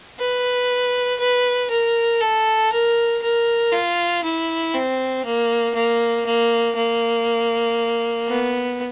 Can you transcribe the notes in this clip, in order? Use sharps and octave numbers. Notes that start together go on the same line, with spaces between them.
B4
B4
A#4
A4
A#4
A#4
F4
E4
C4
A#3
A#3
A#3
A#3
B3